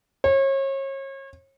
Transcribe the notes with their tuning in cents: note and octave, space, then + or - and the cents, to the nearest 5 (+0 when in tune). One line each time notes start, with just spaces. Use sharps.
C#5 -35